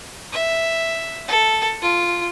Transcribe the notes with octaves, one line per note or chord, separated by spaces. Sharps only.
E5
A4
F4